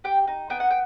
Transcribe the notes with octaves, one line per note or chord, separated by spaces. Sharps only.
G4 G5
D#4
B3 G5
F#5
G5